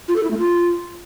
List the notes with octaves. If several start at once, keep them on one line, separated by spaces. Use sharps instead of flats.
F4
A4
E4
A3
F4